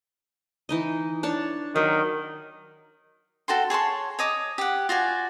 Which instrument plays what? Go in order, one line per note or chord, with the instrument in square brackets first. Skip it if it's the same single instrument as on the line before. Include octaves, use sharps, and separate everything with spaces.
[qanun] E3 D#4 D#5
D4 C#5 A5
[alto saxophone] D#3 [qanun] F#3
[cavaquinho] F#4 A4 G5 C6
G#4 C#5 A5 C6
C#5 D#5 D6 D#6
G4 F#5
F4 F#4 D5 G#5